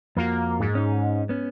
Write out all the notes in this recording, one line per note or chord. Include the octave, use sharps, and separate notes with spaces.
F2 A#3 F4 F#4
G#2
C#4 D#4
B3 C#4